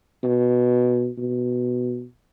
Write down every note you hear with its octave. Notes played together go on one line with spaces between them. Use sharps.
B2
B2